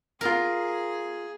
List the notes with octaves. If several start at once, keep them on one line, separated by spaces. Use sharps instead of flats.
E4 F4 G#4 A#4